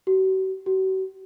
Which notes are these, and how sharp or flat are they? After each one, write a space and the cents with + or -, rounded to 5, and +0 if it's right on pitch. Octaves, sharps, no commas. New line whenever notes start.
F#4 +45
F#4 +45